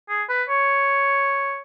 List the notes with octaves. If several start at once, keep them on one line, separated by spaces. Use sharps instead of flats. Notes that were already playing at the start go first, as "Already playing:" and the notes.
G#4
B4
C#5